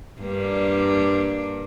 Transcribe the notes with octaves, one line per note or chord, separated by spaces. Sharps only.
G2 A#3 D4